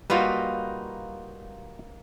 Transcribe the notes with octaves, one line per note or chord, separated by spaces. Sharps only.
G3 A#3 D#4 F4 F#4 B4